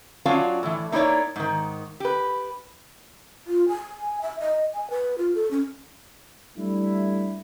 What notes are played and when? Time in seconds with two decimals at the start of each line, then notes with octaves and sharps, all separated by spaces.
0.26 F#3 C#4 D4 F4 F5 G#5
0.63 A2 E3
0.92 A#3 D#4 E4 G4 C#5 D5
1.36 G#2 D#3
2.00 G4 B4
3.47 F4
3.69 G#5
4.22 E5
4.40 D#5
4.74 G#5
4.90 B4
5.18 F4
5.35 A4
5.51 C#4
6.57 G3 A3 D4 E4